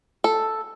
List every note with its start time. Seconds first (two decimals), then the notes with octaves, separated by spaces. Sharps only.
0.24 A4